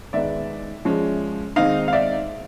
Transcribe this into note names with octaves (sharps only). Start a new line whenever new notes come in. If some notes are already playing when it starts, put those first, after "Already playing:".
D#3 G#3 B3 D#4 D5 E5
F3 G#3 C#4
D#3 G#3 C4 D#4 D#5 F5
F5
D5 E5